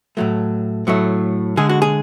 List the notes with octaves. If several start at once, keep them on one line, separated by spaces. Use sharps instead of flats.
A2 F#3 A3
A2 F#3 A3
D3 G#3 G#4
F#4
G#4